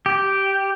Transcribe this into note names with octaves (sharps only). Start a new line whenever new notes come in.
G4